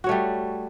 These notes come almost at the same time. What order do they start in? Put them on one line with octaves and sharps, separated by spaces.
F#4 C#5 A3 G3